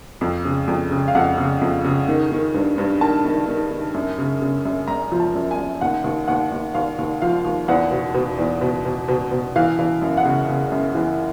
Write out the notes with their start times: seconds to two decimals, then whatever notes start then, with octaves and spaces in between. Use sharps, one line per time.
0.21 F2
0.45 C#3
0.68 F2
0.91 C#3
1.08 F5
1.15 F2 F#5
1.38 C#3
1.61 F2
1.85 C#3
2.08 D#3
2.32 D#3
2.54 G2
2.78 G2
3.01 D#3 A5
3.25 D#3
3.48 D#3
3.71 D#3
3.94 F#2
4.18 C#3
4.42 C#3
4.65 F#2
4.88 F#2 A#5
5.12 F3
5.20 A5
5.35 F#2
5.51 G#5
5.58 F#2
5.81 D#2 F#5
6.04 D#2
6.28 D#2 F#5
6.52 D#2
6.74 D#2 F5
6.99 D#2
7.22 F3 F5
7.45 D#2
7.68 E2 F#5
7.91 B2
8.14 B2
8.39 E2
8.61 B2
8.85 B2
9.08 B2
9.31 B2
9.56 E3 F5
9.79 E3
10.02 F#2
10.17 F#5
10.25 C#3
10.49 C#3
10.72 F#2
10.95 E3